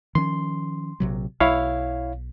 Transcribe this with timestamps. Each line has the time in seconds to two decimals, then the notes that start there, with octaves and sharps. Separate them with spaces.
0.15 D#3 F3 C#4 C6
1.00 A#1 C3 F#3
1.40 B1 E4 C#5 F5